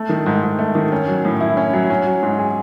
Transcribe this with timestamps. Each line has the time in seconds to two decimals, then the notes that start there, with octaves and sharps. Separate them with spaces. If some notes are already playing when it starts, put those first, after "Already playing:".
Already playing: A3
0.09 D#3
0.26 G#2
0.43 G#2
0.59 A3
0.75 D#3
0.92 C#4
1.08 F#3
1.25 A2
1.41 E4
1.57 C#4
1.73 F#3
1.90 C#4
2.06 F#3
2.23 G#2
2.39 G#4